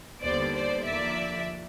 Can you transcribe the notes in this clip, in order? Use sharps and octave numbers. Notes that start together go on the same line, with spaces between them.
D#2 D3 G3 B3 C5 D5
C5 D5
D#2 D3 F3 A#3 D5 E5